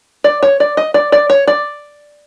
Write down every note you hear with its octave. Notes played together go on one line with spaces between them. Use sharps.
D5
C#5
D5
D#5
D5
D5
C#5
D5